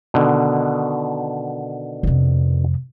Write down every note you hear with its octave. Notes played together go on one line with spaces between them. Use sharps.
B2 D3 D#3
F2 C3